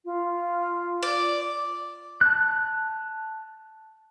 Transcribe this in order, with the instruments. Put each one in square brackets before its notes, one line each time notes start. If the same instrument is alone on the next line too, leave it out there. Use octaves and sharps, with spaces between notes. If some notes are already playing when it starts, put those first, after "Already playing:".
[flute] F4
[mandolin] D5
[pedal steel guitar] A5 F#6